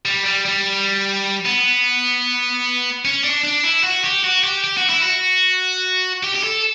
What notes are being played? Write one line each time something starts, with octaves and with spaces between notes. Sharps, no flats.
G3
G3
G3
B3
C#4
D4
D4
E4
F#4
G4
F#4
G4
G4
F#4
E4
F#4
G4
G4
A4